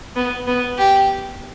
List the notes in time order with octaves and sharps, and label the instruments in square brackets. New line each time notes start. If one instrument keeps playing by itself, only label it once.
[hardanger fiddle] B3
B3
G4